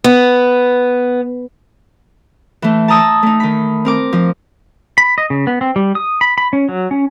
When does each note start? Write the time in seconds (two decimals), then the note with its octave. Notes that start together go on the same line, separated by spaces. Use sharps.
0.04 B3
2.62 E3 A3
2.88 A5 A#5 D#6 E6
3.23 A3 D#4
3.40 D#3 B5
3.85 C4 A#4 D6
4.13 F3
4.98 B5
5.18 D#5
5.30 C#3
5.47 B3
5.61 C4
5.76 G3
5.95 D#6
6.21 B5
6.38 B5
6.53 C#4
6.69 F#3
6.91 C#4